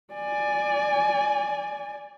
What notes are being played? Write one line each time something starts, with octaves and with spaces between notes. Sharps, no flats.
D5 G#5